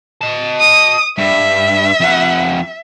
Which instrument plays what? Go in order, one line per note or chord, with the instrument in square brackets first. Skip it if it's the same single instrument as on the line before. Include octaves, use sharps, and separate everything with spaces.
[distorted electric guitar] D#5 A5
[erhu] D#6
[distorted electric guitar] G2 [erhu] E5
[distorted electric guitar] F2 F#5